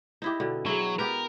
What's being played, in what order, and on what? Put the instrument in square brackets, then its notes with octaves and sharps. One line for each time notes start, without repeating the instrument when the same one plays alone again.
[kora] D#4 E4 G4
B2 D3
[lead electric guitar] F#3 [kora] E4 G#4
[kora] B3 G4 B4 [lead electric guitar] A#4